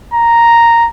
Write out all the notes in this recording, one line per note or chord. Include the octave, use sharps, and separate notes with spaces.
A#5